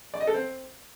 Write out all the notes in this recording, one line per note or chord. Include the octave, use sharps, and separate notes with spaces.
D5
D#5
A4
C4